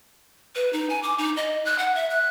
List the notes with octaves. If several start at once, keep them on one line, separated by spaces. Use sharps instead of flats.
B4
D#4
G#5
D6
D#4
D#5
F#6
F#5
E5
F#6